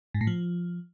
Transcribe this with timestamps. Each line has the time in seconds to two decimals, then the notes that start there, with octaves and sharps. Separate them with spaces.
0.14 G#2
0.21 A2
0.27 F3